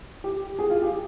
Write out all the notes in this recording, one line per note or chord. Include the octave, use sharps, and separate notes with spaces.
G4
G#4
F4
G4